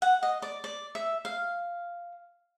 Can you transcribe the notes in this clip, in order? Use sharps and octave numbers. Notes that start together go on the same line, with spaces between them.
F#5
D#5
D5
D5
E5
F5